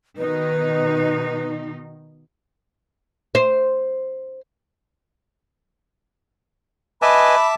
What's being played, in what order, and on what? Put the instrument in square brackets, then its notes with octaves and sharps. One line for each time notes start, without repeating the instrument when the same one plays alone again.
[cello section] B2 D#3 D#4 [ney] B4
[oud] C5
[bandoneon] B4 D#5 G#5 [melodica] E5 A5 D6 [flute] B5